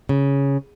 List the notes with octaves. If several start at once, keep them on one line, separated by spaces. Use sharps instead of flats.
C#3